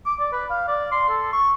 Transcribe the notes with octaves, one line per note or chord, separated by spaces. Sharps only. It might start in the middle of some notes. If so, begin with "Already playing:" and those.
D6
D5
B4
F5
D5
C6
A4
C#6